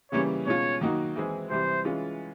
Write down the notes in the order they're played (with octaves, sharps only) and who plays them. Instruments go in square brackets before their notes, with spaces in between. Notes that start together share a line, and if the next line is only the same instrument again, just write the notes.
[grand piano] C#3 E3 G3 A#3 C#4 [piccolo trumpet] C#5
[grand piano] B2 G#3 C#4 F4 [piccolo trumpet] C#5
[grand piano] D#3 F#3 A#3 D#4 F#4
E3 G#3 C4 E4 G#4
[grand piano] C3 E3 G3 [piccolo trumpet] C5
[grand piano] E3 G#3 C#4 F4